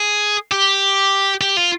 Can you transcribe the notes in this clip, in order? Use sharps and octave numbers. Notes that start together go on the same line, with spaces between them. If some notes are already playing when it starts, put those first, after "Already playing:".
Already playing: G#4
G4
G4
F4